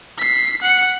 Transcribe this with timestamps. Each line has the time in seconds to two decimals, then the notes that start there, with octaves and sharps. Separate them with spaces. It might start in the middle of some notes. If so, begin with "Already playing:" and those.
0.18 B6 C7
0.62 F#5 C#7